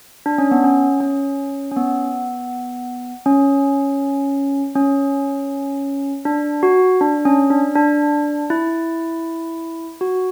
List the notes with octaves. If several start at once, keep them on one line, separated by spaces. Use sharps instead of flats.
D4
C#4
B3
C#4
C#4
C#4
B3
C#4
C#4
D4
F#4
D4
C#4
D4
D4
E4
F#4